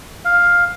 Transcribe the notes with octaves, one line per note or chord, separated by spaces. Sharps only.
F5